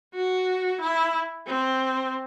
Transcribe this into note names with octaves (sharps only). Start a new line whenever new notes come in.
F#4
E4
C4